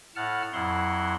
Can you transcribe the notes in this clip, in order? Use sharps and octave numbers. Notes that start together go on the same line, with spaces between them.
A2 F#5 A5 F6
F2 F#3 E4 F#5 C6